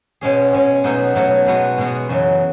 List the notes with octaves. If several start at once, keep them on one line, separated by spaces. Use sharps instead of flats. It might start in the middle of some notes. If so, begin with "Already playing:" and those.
B2 G#3 C#4 G#4
B2 G#3 C#4 G#4
B2 F#3 A3 D#4 F#4
B2 F#3 A3 D#4 F#4
B2 G#3 B3 F#4
B2 G#3 B3 F#4
F#2 C#3 E3